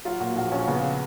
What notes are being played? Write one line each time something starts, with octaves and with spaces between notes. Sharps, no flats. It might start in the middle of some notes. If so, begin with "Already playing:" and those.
F#3 F4
A#2 F#4
A#1 F4
A#1 C#4
C#3 B3